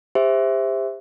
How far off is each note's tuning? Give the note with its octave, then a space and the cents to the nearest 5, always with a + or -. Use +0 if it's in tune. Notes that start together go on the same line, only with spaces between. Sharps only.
G4 +35 C5 +0 E5 +0